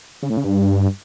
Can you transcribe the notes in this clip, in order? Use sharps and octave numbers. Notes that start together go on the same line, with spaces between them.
C#3
A2
C#3
G2